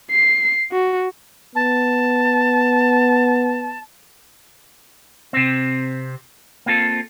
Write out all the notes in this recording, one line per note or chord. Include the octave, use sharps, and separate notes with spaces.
C7
F#4
B3 A5
C3 C4
A#3 C4 F4 A4